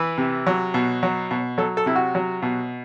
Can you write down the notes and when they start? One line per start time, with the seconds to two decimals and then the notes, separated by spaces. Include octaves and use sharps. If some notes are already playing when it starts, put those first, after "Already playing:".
Already playing: E3 B4
0.18 C3
0.47 F#3
0.74 B2
1.03 F#3
1.31 B2
1.58 F#3 A4
1.77 A4
1.86 C3 E4
1.95 F#4
2.15 F#3
2.42 B2